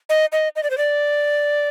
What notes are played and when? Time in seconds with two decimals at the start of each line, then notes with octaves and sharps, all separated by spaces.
0.09 D#5
0.32 D#5
0.56 D#5
0.63 D5
0.70 C5
0.78 D5